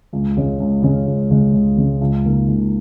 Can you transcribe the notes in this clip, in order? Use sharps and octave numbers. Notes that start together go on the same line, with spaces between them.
C#2
C#3 G#3 C#4
C#2
C#3 G#3 C#4
C#2
C#3 G#3 C#4
C#2
C#3 G#3 C#4
C#2
C#3 A#3 D#4
C#2